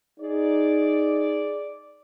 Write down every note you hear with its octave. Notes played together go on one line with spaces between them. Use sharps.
D#4 G#4 D5